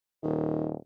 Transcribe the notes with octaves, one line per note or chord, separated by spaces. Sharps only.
D#1 D#3